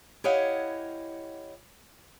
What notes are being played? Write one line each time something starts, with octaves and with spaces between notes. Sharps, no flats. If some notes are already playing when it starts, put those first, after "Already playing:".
E4 G4 C#5 D#5 F5 F#5